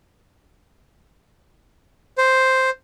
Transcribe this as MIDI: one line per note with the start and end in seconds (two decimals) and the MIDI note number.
2.18 2.70 72